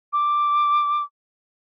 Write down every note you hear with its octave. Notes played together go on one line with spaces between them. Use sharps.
D6